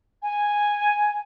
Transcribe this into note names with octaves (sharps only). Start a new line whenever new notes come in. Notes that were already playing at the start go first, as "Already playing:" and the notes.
G#5